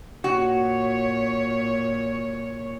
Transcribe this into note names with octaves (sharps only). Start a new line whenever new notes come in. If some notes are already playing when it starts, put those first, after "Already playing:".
A#2 F#4 C#5